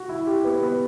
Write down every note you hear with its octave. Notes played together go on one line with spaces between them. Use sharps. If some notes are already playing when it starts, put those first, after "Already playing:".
Already playing: F#4
E4
G4
B3
B3